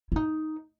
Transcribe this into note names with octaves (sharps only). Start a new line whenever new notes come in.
E4
D#4